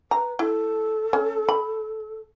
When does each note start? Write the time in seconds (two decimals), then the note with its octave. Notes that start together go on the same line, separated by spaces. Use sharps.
0.11 B4 A#5
0.39 E4 A4
1.13 C#4
1.49 B5